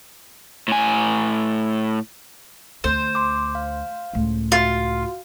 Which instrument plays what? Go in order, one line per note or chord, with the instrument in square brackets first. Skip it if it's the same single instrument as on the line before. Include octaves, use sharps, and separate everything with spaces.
[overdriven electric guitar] A2 G#5
[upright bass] D2 [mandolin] C5
[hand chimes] C6 D6
F5
[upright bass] C#2 A2
[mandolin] F4 [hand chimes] F#4 F5